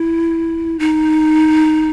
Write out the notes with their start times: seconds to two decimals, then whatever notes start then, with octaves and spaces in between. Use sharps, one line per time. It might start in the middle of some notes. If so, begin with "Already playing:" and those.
Already playing: E4
0.79 D#4